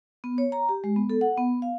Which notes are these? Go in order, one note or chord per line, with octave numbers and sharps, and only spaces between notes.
B3
C#5
A#5
G4
G#3
B3
A4
F#5
B3
F5